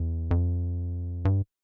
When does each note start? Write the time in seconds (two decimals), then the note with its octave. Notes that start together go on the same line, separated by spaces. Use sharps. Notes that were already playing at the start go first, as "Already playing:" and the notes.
Already playing: E2
0.31 F2
1.25 G2